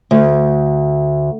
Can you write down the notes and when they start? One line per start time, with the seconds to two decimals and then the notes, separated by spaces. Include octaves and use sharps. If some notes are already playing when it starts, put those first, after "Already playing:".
0.11 D2